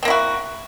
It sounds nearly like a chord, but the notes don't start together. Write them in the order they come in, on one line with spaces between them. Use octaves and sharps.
C4 A#3 E4 F#4